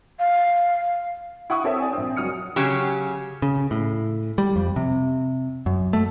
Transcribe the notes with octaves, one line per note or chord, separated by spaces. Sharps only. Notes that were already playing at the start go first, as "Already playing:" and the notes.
F5
E4 F#5 C#6 D#6
C4 A4 C#5 E5
D5 G#5
A#1 C4
F#1 F#3 D#6 F6 C#7
C#3 F#3 G4
C#3
A2
G3
F2
C3
F#2
A3